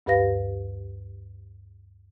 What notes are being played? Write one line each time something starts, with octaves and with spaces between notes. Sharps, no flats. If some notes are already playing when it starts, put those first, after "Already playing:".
D2 G2 G4 B4 F5 A#6